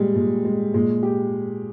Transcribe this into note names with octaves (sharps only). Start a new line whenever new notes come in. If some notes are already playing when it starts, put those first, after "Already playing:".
Already playing: A#2 G3 G#3
A#2 G#3
G#3
A#2 G#3
G4